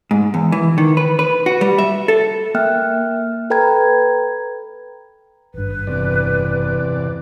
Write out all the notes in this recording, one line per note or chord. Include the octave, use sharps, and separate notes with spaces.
G#2
E2
E3
D#3
B4
B4
F#4
G3
E5
A4
A#3 E5 G5 F6 F#6
A4 B4 G5 A#5 B5 G#6
G#1 G2 B4
E2 C3 D5